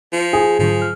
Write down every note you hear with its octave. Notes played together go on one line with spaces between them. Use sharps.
F3
G#4
G#2 D3 F3 F#3
F6